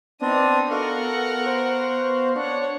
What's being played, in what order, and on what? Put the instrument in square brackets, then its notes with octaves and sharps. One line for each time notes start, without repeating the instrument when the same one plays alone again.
[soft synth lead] B3 [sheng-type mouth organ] C4 D4 [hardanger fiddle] D#4 D#6 [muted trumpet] D5
[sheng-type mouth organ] F#4 F5 [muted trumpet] A4 [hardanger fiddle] A#4 F#5
[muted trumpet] C5
[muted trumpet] D4 [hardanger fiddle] C#5 F#5 [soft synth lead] C#6